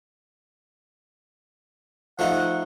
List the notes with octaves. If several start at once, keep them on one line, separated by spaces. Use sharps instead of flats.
F3 A3 D#4 F#5